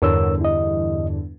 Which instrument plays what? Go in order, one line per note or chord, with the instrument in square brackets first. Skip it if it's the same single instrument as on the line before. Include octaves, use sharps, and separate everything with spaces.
[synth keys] E2 G2 D3 [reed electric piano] A#4 C#5 E6
[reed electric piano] E4 D#5